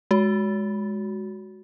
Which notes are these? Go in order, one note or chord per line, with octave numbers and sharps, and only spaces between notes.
G#3 F#4